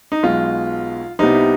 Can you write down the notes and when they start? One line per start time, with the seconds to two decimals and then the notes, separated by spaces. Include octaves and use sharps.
0.12 D#4
0.23 B1 B2 G#3 F4
1.19 C2 C3 G3 B3 D#4